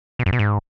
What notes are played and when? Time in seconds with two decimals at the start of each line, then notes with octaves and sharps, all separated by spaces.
0.19 B2
0.26 F#2
0.33 B2
0.39 G#2